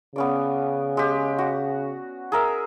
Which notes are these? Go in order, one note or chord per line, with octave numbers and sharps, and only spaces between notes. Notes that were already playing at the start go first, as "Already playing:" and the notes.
C#3 B3 C#4 D5
G#3 G4
F#4
G#4 A#4 E5